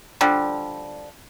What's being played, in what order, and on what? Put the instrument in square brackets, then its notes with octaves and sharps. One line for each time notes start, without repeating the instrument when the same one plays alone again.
[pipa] D3 F3 G3